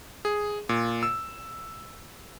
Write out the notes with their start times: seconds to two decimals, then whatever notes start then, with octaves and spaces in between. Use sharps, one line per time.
0.25 G#4
0.69 A#2
1.03 E6